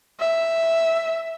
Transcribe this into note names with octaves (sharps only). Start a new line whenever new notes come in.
E5